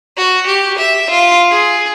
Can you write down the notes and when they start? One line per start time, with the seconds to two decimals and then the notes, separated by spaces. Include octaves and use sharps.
0.17 F#4
0.46 G4
0.78 E5
1.10 F4
1.51 G#4